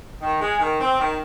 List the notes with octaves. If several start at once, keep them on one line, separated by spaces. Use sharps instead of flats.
D#3
G#3
D#3
C4
D#3